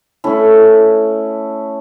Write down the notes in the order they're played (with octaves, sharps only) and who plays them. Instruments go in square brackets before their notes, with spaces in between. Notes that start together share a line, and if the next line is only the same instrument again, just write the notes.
[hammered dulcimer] A3 C#4 E4